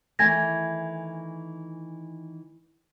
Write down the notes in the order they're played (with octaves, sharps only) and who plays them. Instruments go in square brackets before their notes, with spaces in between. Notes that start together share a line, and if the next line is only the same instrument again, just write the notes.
[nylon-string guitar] D#3 E3 A3 [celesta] G#5 G#6 A#6